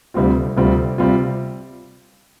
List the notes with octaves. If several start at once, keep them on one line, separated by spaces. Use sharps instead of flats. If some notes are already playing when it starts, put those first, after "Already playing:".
D2 C3 G3 C4 F4
D2 C3 G3 C4 F4
C3 G3 C4 F4